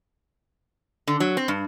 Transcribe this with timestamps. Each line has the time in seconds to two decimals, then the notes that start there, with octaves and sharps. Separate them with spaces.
1.07 D3
1.20 F#3
1.37 C4
1.48 G2